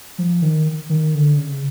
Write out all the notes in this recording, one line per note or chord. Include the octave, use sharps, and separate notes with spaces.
F3
D#3
D#3
D3
C#3